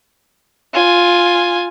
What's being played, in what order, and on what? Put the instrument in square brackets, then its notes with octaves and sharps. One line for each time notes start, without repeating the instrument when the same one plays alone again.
[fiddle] F4 G#5